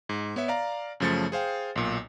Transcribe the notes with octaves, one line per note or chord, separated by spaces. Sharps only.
G#2
B3 C#5 E5
D5 F5 A#5
F#2 C#3 F3 A3 A6 C#7
G#4 C5 F5 G5
B1 A#2